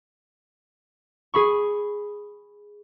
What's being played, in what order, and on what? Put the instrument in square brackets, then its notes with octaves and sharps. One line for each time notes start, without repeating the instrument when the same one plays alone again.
[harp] G#4 B5 C#6